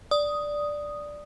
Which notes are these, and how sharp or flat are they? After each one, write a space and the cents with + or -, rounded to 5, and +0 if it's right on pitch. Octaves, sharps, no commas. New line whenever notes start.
D5 +0 D#6 +0